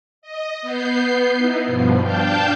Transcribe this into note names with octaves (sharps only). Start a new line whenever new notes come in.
D#5
B3 G6 C7
B3 D#4 E4
G2 B2 F3
D4 F5 G5 A5 G6